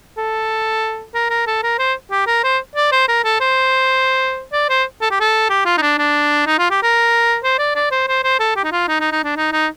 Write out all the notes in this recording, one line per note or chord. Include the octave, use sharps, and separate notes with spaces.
A4
A#4
A#4
A4
A#4
C5
G4
A#4
C5
D5
C5
A#4
A4
C5
D5
C5
A4
G4
A4
G4
F4
D#4
D4
D4
D#4
F4
G4
A#4
C5
D5
D5
C5
C5
C5
A4
G4
D#4
F4
D#4
D#4
D#4
D4
D#4
D#4